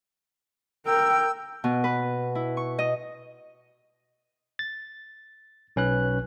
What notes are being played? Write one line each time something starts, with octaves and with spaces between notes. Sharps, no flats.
A#4 G5 E6
B2
B4
E4
C#6
D#5
A6
B1 C#4 B4 F#6